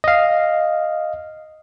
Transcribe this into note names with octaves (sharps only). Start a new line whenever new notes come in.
D#5 F5